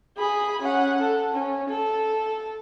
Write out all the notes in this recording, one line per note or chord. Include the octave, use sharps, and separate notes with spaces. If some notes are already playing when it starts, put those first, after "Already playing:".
G#4 B5
C#4 F#5
A4
C#4
A4